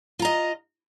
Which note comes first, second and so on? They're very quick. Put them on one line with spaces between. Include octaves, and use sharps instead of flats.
F4 A#5 D#5